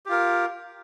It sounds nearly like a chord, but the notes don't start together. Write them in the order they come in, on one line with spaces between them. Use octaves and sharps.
G4 F4 A#4